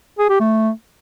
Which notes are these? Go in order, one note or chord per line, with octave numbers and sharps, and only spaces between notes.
G#4
G4
A3